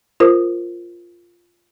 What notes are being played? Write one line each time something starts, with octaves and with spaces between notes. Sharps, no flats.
F4 A#4 C5 D#6